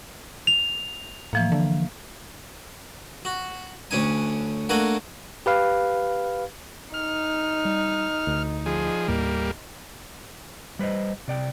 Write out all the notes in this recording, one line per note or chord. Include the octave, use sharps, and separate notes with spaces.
F7
A2 E3 F3 A#3
D3
F#4
D2 C#4 D4 G#5
A3 A#3 D4 F#4 F#5 G#5
G4 B4 F5
D#4 F6
G3
D2
F3 G#4
D#2 A2 G3 A#3
G3 B4 C5 D#5
C3 D5 G5